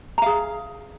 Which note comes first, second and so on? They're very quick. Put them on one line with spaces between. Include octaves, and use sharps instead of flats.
A#5 F5 G#4